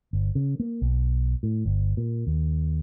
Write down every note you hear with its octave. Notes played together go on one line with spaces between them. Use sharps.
G1
C#3
A#3
B1
A2
G1
A#2
D#2